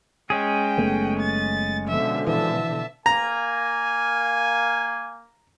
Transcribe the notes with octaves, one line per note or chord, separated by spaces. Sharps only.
G#3 C#4 G#4 G5
F#1 A3 B3
A6
B2 D3 F3 E5
E3 E5 A5
A#3 G#5 A#5